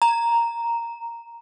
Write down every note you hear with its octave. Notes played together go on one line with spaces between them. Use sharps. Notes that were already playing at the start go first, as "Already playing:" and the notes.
A#5